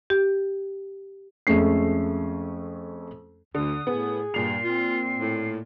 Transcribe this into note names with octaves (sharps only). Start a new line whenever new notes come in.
G4
F2 G#3 A3 C#4 C7
D2 D3 D#6
A2 B3 G#4
G2 A#2 C7 F7
C4 F4
A2